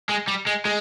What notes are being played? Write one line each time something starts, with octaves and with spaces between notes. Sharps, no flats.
G#3
G3
G#3
G#3